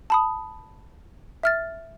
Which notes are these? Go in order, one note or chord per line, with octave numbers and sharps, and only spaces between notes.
A5 B5 D#6
E5 F6 A6